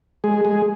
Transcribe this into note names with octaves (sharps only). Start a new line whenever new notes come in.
G#3 G#4
G#3 G#4